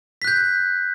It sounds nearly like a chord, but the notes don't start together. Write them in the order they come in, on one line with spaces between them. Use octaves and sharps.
B6 F#6 G6